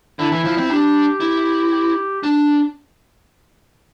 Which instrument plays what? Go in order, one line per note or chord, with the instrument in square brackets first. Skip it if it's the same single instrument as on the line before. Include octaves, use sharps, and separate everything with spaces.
[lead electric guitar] D3 [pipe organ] E4
[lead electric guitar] E3
F3
C4
[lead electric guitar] D4 [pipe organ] G4
[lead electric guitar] E4
[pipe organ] G4
[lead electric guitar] D4